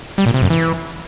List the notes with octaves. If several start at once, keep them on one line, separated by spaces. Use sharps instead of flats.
G3
A#2
C3
F#2
E3